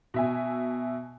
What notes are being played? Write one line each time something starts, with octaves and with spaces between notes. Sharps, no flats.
B2 E5 G#5